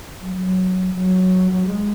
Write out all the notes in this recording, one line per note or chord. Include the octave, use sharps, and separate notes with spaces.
F#3
F#3
F#3
F#3
G#3